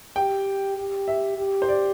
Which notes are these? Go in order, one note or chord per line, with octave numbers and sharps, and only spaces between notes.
G4 G5
G4
E5
G4
C5
D5